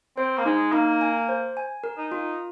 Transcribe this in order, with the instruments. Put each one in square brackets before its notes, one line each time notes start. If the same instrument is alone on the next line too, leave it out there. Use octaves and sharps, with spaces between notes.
[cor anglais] C4 [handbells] C5
[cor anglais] A#3
[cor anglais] G#3 [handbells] D#4
[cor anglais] A#3 [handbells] D#4
[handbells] G#5
C5
G#5
A#4
[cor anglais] D#4
[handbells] F4